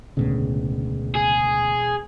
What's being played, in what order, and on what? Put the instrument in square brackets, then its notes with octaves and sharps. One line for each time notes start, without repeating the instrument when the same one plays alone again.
[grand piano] E1 [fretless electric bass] D2 A2 C#3
[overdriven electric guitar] G#4